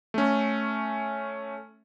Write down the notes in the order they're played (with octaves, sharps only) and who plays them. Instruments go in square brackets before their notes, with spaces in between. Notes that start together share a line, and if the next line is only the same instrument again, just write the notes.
[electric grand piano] A3 C#4